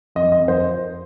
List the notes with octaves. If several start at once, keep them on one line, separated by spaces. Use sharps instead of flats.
F2 D#5
D#5
F2
C5